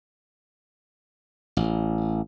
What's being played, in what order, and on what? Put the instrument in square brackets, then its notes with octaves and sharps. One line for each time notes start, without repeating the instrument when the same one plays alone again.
[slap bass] A1